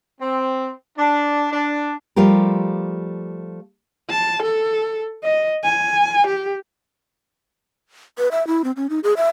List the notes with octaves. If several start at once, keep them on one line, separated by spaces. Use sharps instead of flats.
C4
D4
D4
F3 G3 A3 F4 G4 A#4
A5
A4
D#5
G#5
G4
B4
E5
E4
C4
C#4
D#4
G#4
E5